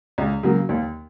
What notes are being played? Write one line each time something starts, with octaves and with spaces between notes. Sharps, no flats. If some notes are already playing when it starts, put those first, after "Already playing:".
C#2
C#3 F#3 A#3
D#2